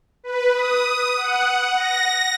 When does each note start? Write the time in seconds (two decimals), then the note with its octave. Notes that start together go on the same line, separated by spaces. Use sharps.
0.24 B4
0.54 D#6
1.17 F#5
1.74 A#6